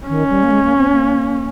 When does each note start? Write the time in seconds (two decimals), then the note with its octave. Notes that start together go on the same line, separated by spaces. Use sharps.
0.09 D#3 C#4
0.30 G3
0.43 A#3
0.51 G#3
0.64 A#3
0.77 C4
0.91 A#3